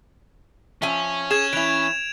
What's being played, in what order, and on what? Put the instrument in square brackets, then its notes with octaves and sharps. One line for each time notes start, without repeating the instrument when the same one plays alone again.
[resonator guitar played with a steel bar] F3 E5 G#5 [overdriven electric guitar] C#4
[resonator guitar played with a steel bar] G#4 [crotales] G#6 E7
[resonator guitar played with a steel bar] E3 E4 [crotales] D7 F7